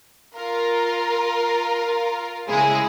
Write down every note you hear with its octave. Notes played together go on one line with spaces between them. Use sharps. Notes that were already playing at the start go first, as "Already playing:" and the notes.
F4 A#4
C#3 G#3 E4 G#4